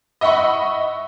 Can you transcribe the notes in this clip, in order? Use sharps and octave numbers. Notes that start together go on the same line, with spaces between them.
D#5 E5 F#5 B5 C#6